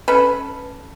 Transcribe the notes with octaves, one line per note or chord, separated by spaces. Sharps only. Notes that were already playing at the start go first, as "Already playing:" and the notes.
C#4 A4 B4